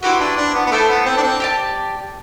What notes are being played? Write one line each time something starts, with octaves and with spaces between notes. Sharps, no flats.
C4 E4 F#4 G4 B4
D4
D4
B3
B3
A3 E4 A4 C5
B3
C4
D4
C4
G4 D5 A5